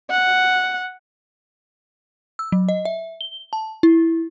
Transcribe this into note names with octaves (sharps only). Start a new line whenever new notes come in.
F#5
E6
F#3
D#5
E5
G7
A5
E4